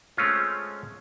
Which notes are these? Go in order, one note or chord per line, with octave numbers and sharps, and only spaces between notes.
G#3 A3 C4 C#4 F4